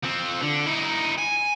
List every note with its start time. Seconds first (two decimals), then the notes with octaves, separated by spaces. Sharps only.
0.04 F3 C4
0.42 D3
0.67 D#4 E4
1.18 G#5